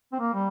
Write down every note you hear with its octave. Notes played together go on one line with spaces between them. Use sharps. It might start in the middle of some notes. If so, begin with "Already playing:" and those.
C4
A#3
G3